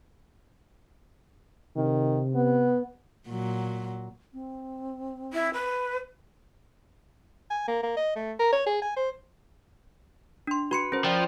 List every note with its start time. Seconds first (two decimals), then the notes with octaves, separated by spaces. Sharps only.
1.76 C3 D#3
2.35 B3
3.27 A#2 F#3
4.33 C4
5.33 E4
5.53 B4
7.50 G#5
7.68 A#3
7.83 A#3
7.97 D#5
8.16 A3
8.39 A#4
8.53 C#5
8.66 G#4
8.82 G#5
8.97 C5
10.47 D4 C6
10.71 F#4 B4 C6 C#7
10.92 C#4 A#4 C5
11.04 F3 B4 D5 G5